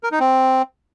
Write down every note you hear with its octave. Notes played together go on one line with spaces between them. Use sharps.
A#4
D#4
C4